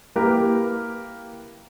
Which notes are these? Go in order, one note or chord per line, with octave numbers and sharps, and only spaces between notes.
A#3 E4 G4 A#4 B4